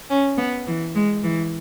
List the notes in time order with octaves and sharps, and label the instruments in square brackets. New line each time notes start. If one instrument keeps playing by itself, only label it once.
[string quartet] C#4
B3
E3
G#3
E3